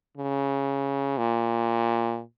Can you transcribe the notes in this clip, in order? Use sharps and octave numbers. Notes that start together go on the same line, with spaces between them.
C#3
A#2